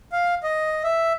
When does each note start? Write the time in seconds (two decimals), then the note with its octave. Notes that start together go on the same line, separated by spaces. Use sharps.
0.12 F5
0.43 D#5
0.84 E5